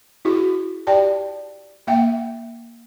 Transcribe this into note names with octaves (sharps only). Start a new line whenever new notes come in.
E4 F#4 G#4
G4 D5 G5 A5
A#3 E5 F#5 G5